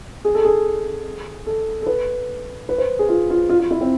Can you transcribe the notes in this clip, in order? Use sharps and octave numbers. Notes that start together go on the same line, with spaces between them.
G#4
A4
G#4
A4
A4
B4
B4
C5
G#4
F4
F4
F4
F4
E4
C4